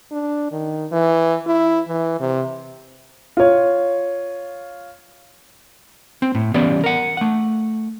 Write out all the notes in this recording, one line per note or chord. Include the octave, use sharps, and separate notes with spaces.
D4
D#3
E3
E4
E3
C3
F4 C#5
C4
A2
E3 G3 B3 C#4 D5
A#4 F#5
A3 F#5